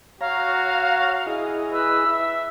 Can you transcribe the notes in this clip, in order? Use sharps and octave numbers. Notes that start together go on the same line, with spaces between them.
F#4 C#5 F5 A#5
E4 G#4 D#5
B4 E6
E5